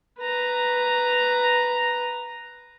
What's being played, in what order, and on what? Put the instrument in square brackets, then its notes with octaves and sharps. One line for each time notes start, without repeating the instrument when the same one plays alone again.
[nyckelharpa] B4 A#5